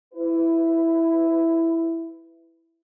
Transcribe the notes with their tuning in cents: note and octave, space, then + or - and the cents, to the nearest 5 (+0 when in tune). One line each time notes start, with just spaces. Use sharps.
E4 +0 B4 +20